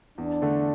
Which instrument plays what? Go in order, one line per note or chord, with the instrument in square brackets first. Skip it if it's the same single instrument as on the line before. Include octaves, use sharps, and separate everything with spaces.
[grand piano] E2 [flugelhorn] D4
[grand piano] D3 A3